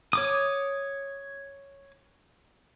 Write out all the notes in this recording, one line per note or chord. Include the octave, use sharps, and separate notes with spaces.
C#5 D6 D#6